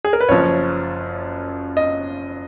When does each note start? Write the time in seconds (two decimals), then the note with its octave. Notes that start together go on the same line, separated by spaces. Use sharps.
0.05 G#4
0.13 A#4
0.21 B4
0.29 F#1 F#2 F3 C#5
1.77 D#5